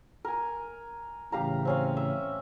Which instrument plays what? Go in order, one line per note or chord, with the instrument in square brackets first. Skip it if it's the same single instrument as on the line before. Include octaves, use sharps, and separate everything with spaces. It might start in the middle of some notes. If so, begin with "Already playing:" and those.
[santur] A#4 G#5
[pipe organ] A2 C#3 E3 [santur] G4 F5 A#5
[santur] C4 C#4 F5
E5